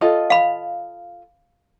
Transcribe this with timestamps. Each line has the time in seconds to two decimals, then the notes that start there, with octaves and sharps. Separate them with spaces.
0.01 F4 A4 D#5
0.30 F5 B5